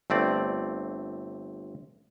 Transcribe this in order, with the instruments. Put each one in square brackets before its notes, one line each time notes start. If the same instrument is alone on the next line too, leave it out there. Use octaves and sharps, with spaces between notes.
[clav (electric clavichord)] G1 A3 C4 D5